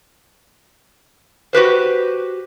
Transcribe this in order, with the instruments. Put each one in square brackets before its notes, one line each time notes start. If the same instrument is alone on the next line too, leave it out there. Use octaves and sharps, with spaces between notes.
[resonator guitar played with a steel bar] F#4 G4 B4 C5